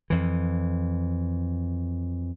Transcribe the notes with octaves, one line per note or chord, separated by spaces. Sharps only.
F2 E3